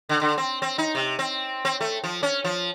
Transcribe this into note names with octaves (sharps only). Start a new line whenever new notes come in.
D3
D3
C4
C4
D#4
C3
C4
C4
A3
F3
C#4
F3